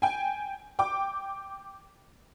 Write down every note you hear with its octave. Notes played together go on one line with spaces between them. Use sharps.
G5 G#5
G5 D6